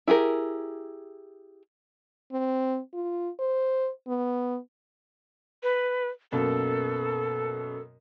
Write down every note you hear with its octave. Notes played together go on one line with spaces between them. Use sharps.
E4 G4 G#4 A#4
C4
F4
C5
B3
B4
F#2 B2 A#3 A4